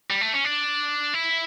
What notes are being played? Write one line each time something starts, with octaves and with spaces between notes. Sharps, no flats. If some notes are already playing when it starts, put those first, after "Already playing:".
G3
A3
C#4
D4
E4